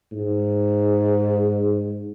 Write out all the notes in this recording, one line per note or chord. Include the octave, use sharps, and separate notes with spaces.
G#2